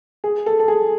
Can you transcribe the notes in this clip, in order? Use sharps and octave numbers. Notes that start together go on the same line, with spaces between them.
G#4
A4
A4
G#4